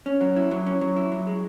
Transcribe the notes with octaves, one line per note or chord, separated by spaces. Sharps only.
C#4
F#3
E4
F#3
C#4
F#3
E4
F#3
G#3